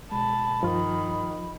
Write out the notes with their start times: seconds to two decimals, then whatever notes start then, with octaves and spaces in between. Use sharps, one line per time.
0.11 B2 G#3 A5 B5
0.63 G2 D#3 F3 F4